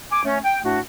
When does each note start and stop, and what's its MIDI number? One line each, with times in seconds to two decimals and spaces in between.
0.11 0.21 80
0.11 0.21 86
0.24 0.38 57
0.24 0.38 61
0.44 0.58 79
0.64 0.79 45
0.64 0.79 57
0.64 0.79 62
0.64 0.79 66